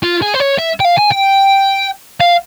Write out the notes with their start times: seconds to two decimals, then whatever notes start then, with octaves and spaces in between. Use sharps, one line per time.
0.03 F4
0.22 G#4
0.34 C5
0.40 C#5
0.58 E5
0.80 G5
0.85 F5
0.98 G#5
1.12 G5
2.21 F5